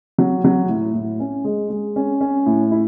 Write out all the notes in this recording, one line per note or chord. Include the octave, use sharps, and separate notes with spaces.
F#3
F#3
A2
A2
C#4
G#3
G#3
C#4
C#4
A2
E4